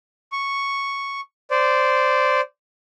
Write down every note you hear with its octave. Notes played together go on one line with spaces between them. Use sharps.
C#6
C5 D5